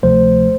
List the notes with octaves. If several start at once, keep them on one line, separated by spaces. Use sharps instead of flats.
D2 C3 F3 A3 C5